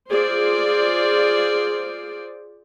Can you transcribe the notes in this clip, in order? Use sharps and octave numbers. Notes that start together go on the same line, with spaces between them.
F4 G#4 C5 D5